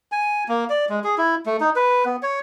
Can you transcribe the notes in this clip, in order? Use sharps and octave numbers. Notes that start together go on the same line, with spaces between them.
G#5
A#3
D5
G#3
G#4
E4
A3
D#4
B4
B3
C#5